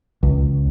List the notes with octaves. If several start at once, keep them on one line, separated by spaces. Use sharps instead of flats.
C#2